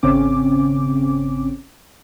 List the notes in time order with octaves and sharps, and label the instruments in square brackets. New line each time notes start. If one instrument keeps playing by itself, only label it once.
[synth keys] G#1 C#3 C4 C#4 D6